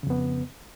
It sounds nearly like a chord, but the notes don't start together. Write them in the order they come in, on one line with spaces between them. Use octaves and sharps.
C#3 F2 B3